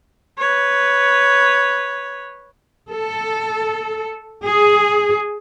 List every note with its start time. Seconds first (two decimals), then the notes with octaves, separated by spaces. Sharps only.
0.38 B4 C#5
2.89 A4
4.43 G#4